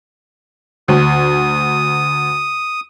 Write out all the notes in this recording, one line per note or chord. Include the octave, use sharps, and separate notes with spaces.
D2 D#6